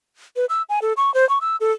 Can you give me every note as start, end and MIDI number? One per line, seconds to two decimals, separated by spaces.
0.36 0.45 71
0.49 0.62 88
0.69 0.79 80
0.82 0.93 69
0.97 1.13 85
1.14 1.28 72
1.29 1.39 85
1.41 1.56 88
1.60 1.72 69